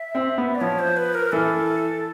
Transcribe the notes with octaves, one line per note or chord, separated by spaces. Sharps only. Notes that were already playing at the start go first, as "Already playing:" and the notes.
Already playing: E5
C4
B3
D5
F3 C#5
C5
B4
A#4
E3 A4